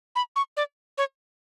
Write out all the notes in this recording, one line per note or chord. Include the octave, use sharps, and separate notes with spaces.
B5
C#6
D5
C#5